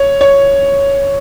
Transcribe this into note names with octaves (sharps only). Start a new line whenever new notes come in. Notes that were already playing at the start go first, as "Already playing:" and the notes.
Already playing: C#5
C#5